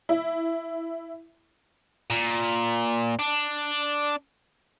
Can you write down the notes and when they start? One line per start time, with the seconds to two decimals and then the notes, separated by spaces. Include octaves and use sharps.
0.09 E4
2.10 A#2
3.19 D4